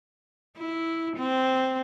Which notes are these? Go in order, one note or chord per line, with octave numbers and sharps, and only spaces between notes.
E4
C4